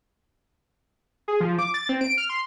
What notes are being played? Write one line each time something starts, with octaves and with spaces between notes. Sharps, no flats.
G#4
F3
D6
A6
C4
D7
F6
C6